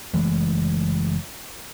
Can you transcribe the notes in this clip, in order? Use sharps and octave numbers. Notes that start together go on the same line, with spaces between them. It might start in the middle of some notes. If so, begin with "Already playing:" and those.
F#1 E3 G#3 A3